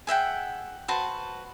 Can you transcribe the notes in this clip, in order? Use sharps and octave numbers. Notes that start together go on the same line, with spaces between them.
G#4 E5 F#5 G5
F#4 B4 C5 A5